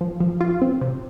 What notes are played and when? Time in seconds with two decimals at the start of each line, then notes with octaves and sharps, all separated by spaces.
0.01 F3
0.20 F3
0.41 F4
0.62 C4
0.81 C3